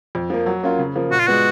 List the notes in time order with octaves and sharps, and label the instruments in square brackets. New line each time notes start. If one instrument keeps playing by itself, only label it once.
[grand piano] F2
F3 A#3
F#3
A#3 C#4 F4
C#3
F3 A#3
[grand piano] A#2 [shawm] F#4
[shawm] F4
[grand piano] G#3 B3 [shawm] F#4